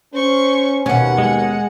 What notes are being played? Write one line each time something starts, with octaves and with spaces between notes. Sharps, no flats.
C#4 C5 C#6
D#2 B2 C#4 F#5
G#3